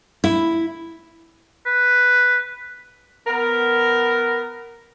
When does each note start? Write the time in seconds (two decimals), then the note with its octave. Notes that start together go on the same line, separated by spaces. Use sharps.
0.24 E4
1.66 B4
3.27 B3 A#4